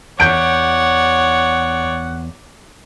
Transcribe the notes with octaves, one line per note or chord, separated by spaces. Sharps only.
E2 C#5 D5 F#5 G6 D7